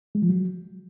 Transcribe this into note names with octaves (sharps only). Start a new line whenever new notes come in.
G#3
F3
F#3